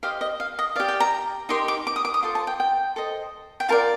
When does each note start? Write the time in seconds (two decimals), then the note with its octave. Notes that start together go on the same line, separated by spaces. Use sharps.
0.03 G4 C5 D#5 F5
0.21 D#5
0.40 F5
0.59 D#5
0.76 G4 D5 F5
0.88 G5
1.00 A#5
1.49 D#4 G4 A#4 C6
1.68 D6
1.87 D6
1.96 D#6
2.05 D6
2.14 D#6
2.22 F4 A4 C5 C6
2.35 A5
2.47 G5
2.60 G5
2.96 A4 C5 D#5
3.60 G5
3.69 F4 A#4 D5 A5